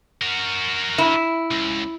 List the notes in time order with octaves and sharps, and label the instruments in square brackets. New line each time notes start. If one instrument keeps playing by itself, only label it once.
[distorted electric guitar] F#4 A#4
[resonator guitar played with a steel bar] E4
[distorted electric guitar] C#2